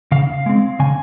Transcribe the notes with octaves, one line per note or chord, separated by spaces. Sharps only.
C#3 F5
G#3 C4
C#3 G#5